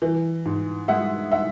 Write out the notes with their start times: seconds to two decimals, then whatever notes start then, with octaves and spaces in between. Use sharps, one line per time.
0.02 E3
0.45 G#2
0.88 G#3 E5 F#5
1.32 E5 F#5